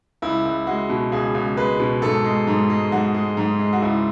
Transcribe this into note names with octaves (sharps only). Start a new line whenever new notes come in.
C#2 E4
C#2
G#3 F#4
B2
C#2 G#4
C#2
G#3 B4
B2
G#2 A4
G#3
G#2
G#3
G#2 F#4
G#3
G#2
G#3
F#4
C#2 E4